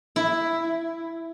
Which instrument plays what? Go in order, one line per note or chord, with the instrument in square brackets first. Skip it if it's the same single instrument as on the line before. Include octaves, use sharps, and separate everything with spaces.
[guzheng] E4